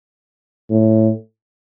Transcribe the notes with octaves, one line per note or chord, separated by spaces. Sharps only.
A2